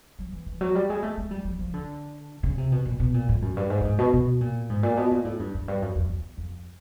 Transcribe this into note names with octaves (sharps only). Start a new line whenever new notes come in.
F#3
E3
E3
F#3
G3
G#3
A3
G#3
G3
F#3
F3
D3
C#3
C3
B2
A#2
B2
A#2
A2
F#2
G2
G#2
A2
G#2
B2
B2
A#2
G#2
A#2
B2
A#2
A2
G2
F#2
G2
F#2
F2
E2
F2